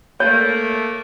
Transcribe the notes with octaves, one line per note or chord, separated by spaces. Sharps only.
A3 A#3 C#5